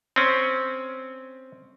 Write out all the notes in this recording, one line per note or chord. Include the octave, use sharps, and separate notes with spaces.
C4 C#4